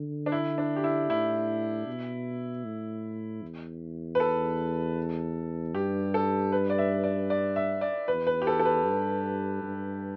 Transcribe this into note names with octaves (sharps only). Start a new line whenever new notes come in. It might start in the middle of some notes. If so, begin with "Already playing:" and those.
Already playing: D3
D4
E4
D4
G4
E4
A2 E4
B2
A2
E2
B4
A4
G2 G4
A4
B4
D5
E5
D5
D5
E5
D5
E2 B4
B4
G4
A4
A4
B4
G2
G2